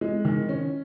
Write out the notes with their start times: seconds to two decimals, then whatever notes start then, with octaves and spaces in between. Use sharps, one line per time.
0.01 G#3
0.25 D#3
0.49 C#4